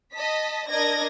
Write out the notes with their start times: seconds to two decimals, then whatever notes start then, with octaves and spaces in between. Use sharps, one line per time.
0.16 D#5 A5 B6
0.71 D4 A#4 D#5 G#6 A#6